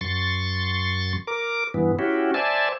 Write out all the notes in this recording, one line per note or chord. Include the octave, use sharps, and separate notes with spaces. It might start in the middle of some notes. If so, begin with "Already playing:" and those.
F#2 C6 C#6 A6
A#4 D6
G2 E3 B3
C#4 E4 F#4 G4
C5 D5 E5 G#5 A5